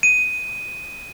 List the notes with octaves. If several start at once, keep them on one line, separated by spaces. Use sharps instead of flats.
D#7